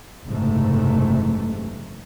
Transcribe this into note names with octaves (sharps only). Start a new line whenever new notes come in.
F#1 G#2 C3 E3 A3